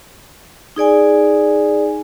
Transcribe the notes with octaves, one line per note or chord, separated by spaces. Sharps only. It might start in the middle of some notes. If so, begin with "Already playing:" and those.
D#4 G#4 D5 G#5